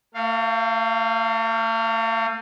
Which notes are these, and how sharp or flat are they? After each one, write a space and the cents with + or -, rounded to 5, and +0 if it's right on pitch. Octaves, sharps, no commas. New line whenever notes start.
A3 +45 F5 +0